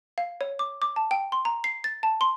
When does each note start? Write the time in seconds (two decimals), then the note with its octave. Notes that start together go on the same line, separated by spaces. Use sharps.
0.18 F5
0.41 C#5
0.59 D6
0.82 D6
0.96 A5
1.11 G5
1.32 C6
1.45 A#5
1.64 C7
1.84 A6
2.03 A5
2.21 C6